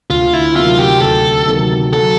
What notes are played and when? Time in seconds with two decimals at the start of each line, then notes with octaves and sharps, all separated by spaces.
0.10 D2 F4
0.33 E4
0.56 C3 D#3 F#3 A#3 F4
0.79 G4
1.02 D2 A4
1.48 C3 D#3 F#3 A#3
1.93 F#3 A4